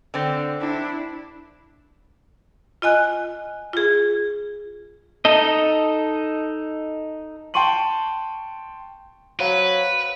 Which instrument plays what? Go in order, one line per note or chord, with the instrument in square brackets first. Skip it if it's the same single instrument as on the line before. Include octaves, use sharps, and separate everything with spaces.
[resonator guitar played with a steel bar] D3 C4
[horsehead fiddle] D4 E4
[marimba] F4 D#5 G#5 F#6
F4 G#4
[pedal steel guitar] D#4 A4 D#5
[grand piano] G5 A5 C6 C#6 D#7 F#7
[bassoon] F#3 [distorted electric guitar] B4 [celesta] C5 F5